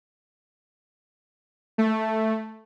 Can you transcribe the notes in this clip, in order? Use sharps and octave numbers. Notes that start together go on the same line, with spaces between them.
A3